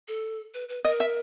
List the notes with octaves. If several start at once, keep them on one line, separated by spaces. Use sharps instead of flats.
A4
B4
B4
A#4 D#5
E5